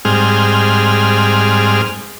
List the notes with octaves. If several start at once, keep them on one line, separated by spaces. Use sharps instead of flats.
G#2 G3 C4 G#4 F6